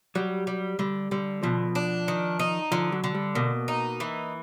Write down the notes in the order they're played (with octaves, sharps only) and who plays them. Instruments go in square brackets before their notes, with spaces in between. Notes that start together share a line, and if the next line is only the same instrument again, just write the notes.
[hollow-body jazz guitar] F#3 [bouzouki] G3
[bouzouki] G3
[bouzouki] D3 [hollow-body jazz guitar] G3
[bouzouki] D3 [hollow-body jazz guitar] G3
[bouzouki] B2 [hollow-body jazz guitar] F3
[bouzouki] D4
D#3
D#4
[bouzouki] D3 [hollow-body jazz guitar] F3
[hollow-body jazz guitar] F#3
[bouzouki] D3
[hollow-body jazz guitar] G3
[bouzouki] B2 [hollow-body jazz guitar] A#3
[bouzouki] D#4
E3